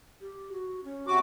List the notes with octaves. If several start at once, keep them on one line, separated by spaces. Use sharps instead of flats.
G4
F#4
C#4
C3 F#4 D6